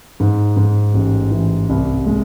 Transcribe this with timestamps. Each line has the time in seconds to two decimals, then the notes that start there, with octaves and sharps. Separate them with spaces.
0.20 G#2
0.57 G#2
0.94 A1
1.31 E3
1.69 C2
2.06 G#3